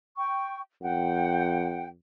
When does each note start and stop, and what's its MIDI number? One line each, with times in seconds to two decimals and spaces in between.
0.17 0.61 79
0.17 0.61 85
0.82 1.96 41
0.82 1.86 78
0.82 1.86 79